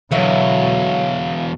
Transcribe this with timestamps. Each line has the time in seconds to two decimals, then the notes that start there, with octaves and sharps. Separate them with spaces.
0.11 E2 B2 D3 F#3 F#4 C#5 E5 F5